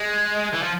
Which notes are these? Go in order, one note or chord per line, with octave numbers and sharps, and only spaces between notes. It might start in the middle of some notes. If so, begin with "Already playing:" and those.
Already playing: G#3
E3
F3